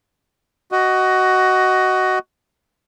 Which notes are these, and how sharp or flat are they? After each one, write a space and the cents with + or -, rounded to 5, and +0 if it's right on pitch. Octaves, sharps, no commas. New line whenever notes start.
F#4 +15 D#5 +0